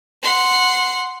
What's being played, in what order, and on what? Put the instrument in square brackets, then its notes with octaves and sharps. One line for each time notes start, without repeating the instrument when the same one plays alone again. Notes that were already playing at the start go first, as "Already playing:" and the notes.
[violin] F#5 C6